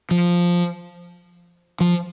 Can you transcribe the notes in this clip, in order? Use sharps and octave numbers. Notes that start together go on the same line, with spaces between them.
F3
F3